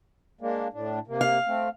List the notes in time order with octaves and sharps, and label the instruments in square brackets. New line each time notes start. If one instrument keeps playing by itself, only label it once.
[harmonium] G#3 A#3 D4
A2 D4
C3 A#3
[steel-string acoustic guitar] F5
[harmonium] A3 C4